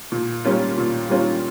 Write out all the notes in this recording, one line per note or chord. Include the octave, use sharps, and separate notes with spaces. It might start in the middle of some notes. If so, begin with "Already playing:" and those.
A#2
G3 A#3 C#4 F4
A#2
G3 A#3 C#4 F4